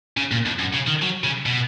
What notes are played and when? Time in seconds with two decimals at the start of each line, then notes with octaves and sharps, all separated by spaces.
0.17 C#3
0.32 A#2
0.46 F2
0.60 F#2
0.74 C#3
0.88 D#3
1.03 F#3
1.24 C#3
1.46 B2